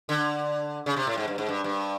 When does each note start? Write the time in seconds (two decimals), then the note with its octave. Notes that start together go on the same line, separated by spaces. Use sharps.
0.09 D3
0.86 C#3
0.96 C3
1.07 A2
1.18 G#2
1.28 G2
1.38 G#2
1.49 G2
1.64 G2